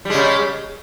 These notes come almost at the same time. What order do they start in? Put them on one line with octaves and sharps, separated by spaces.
G3 G#3 C#3